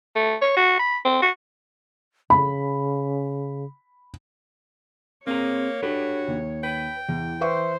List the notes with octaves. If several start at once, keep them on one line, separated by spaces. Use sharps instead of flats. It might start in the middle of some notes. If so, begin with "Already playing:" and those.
A3
C#5
F#4
B5
C4
F#4
C#3 B5
A#3 C4 G#4 C#5 A#5
D4 F#4 G4 A4 B4
D#2
B4 G5
E2 E3
B4 C5 E5 C#6